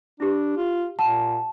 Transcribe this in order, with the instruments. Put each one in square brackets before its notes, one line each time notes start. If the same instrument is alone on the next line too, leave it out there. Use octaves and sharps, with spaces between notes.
[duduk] D4 [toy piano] E4 G4
[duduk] F4
[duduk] A#2 [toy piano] F#5 [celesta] A5